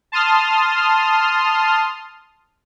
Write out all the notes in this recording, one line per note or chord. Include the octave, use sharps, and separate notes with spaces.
A5 C6 D#6 F6